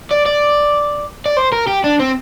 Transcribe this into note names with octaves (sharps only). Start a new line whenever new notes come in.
D5
D5
D5
C5
A#4
G4
D4
C4